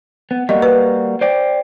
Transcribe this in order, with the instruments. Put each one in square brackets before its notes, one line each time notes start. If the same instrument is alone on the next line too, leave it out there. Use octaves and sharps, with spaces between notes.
[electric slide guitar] B3
[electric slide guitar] G3 A#3 F#4 [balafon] D#5
[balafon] B4
[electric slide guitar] C5 D5 G5